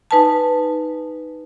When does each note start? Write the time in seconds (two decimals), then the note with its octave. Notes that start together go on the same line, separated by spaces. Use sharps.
0.11 D#4 B4 G#5 A5